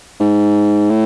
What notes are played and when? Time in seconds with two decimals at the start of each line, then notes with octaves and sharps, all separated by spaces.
0.20 G#2
0.90 A2